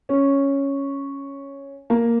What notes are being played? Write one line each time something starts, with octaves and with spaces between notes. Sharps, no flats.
C#4
A#3